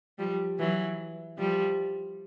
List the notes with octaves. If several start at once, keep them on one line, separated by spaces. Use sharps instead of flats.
F3 G3
E3 F#3
F3 G3